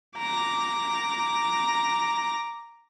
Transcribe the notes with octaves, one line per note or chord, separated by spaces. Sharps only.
A#5 D6